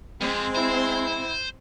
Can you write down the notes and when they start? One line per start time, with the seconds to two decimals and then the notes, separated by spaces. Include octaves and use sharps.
0.21 F2 G#3 C4
0.55 E4 C5